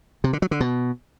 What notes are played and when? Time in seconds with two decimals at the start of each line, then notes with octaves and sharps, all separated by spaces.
0.24 C3
0.33 D3
0.42 F#3
0.51 D3
0.60 B2